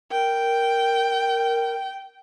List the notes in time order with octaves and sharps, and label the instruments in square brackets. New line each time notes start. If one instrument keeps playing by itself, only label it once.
[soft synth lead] A#4 [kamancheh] G5